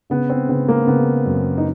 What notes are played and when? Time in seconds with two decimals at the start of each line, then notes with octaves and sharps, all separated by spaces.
0.10 C#3 B3
0.30 C4
0.49 C#3 B3
0.68 A#3
0.87 C#3 B3
1.26 F#2
1.58 D#4